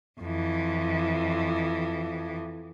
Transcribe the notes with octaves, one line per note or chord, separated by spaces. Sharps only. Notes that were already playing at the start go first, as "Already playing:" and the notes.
F2 E3